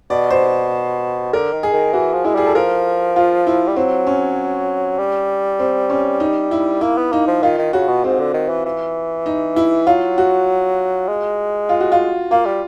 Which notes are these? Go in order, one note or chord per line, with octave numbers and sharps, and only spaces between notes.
B2 D5
C5
D3 A#4
D#3
G#4
D#3
E3 F#4
F3
G#3 E4
G3 G#4
A4
F3 A#4
F4
E4
G3
F#3 C4
C#4
G3
C4
C#4
D#4
E4
A#3 E4
B3
A#3 D#4
F3
D#3 F4
D#3
C#3 F#4
B2
G#2 C4
D3
D#3
E3
E3
D#4
E4
F#3 F4
F#4
G#3
F4
F#4
F4
A#3 F4
G3